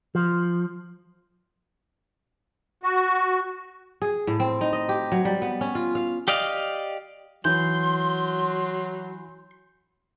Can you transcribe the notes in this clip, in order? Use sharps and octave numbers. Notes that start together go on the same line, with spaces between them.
F3
F#4
G#4
A2
C4
D#4
D#5
G4
F#3
G3
B3
C#4
F4
F5
G4 D5 D#5 F5
E3 F#3 C6 G6